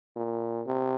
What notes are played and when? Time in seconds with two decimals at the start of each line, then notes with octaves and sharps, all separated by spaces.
0.16 A#2
0.67 C3